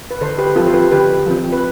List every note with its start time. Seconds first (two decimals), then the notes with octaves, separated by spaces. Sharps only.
0.11 B4
0.21 D3 A4 C5
0.38 G4 B4
0.56 F3 C4 F4 A4
0.67 C5
0.74 G4 B4
0.92 D3 G4 B4
1.26 F3 C4
1.52 B4